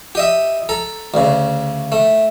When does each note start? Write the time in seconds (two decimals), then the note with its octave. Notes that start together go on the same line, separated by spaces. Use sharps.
0.15 G4 D#5 E5
0.69 A4 A#5
1.14 D2 C#3
1.92 A3